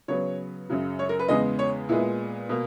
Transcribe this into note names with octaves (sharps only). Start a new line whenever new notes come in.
C#3 F#3 B3 C#5
F#2 C#3 F#3
C#5
A#4
B4
E2 C#3 G#3 B3 D#5
C#5
A#2 G#3 B3 E4
B2 A#3